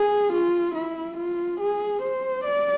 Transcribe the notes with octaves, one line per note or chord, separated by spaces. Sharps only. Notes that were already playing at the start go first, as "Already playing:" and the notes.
Already playing: G#4
F4
E4
F4
G#4
C5
D5